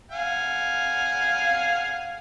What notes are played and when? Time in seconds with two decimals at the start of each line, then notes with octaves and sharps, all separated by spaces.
0.11 F5 F#5 G#5